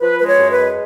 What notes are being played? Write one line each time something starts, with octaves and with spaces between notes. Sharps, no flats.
F3 B4
G#3 B4
C#5
F#2
B4
G#3